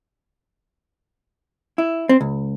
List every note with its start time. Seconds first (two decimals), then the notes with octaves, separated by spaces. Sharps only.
1.78 E4
2.09 C4
2.21 C#2